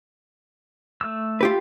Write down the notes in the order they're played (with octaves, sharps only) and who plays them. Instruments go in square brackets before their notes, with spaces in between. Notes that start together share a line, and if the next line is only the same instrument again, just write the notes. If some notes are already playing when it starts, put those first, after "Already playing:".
[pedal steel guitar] A3 E6
[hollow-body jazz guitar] F4 G4 B4